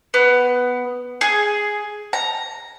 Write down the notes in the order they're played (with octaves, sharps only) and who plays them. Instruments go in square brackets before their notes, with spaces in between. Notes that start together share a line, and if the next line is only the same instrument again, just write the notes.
[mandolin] B3
G#4
A#5